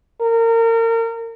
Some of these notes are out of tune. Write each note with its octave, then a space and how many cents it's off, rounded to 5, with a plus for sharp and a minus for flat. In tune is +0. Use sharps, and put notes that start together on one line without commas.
A#4 -30